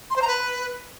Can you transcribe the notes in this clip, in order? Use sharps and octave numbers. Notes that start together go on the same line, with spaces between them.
C6
C5
A#5
B4